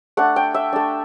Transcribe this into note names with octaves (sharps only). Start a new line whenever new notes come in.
A3 D4 F#5
G5
E5
A3 D4